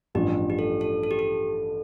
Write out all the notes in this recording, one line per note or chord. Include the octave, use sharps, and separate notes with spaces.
A1 G2 F3 G4
G4
A4
A4
A4
G4
A4